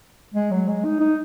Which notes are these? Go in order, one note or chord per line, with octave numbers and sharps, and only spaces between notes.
G#3
F#3
G#3
D#4
D#4